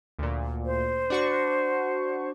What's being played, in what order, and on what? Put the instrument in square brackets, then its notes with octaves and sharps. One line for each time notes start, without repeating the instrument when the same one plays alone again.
[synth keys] D2 A#2
[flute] C5
[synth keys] D4 F#4 C#6